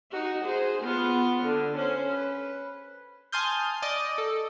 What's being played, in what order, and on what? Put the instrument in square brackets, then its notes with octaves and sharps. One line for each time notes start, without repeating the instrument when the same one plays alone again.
[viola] D#4 F#4
G#4 C5
B3 F4
D3
C#4 C5
B4
[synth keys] G#5 A5 C6 D#6 F6 G6
D5 D#5
A4